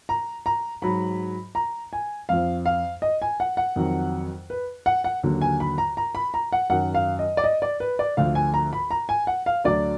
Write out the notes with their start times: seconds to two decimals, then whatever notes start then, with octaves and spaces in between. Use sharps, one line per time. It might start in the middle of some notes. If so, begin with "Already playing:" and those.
0.09 A#5
0.46 A#5
0.82 G#2 F#3 B5
1.55 A#5
1.93 G#5
2.29 F2 F3 F5
2.66 F5
3.02 D#5
3.22 G#5
3.40 F#5
3.57 F#5
3.76 F2 D#3 F#3
4.50 B4
4.86 F#5
5.04 F#5
5.23 D#2 D3 F#3
5.41 G#5
5.60 B5
5.78 A#5
5.97 A#5
6.15 B5
6.34 A#5
6.52 F#5
6.70 F#2 D#3 F#3 F#5
6.95 F5
7.19 D#5
7.37 D5
7.44 D#5
7.62 D5
7.80 B4
7.99 D5
8.17 D2 D3 F3 F5
8.35 G#5
8.54 A#5
8.73 B5
8.91 A#5
9.09 G#5
9.27 F#5
9.46 F5
9.64 D2 D3 F#3 D5